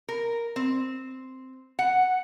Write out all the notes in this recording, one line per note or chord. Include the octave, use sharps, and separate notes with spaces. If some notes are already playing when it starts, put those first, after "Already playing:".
A#4
C4
F#5